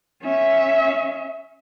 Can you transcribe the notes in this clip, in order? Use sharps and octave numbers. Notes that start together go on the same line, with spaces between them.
C#4 E5